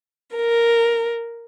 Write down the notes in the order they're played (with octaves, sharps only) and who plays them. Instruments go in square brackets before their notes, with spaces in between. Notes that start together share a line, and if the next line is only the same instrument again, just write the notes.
[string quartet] A#4